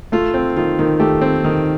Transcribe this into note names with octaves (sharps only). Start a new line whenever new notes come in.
A3 F4
C4
D#3 F4
D#3
A3 G4
C4
D#3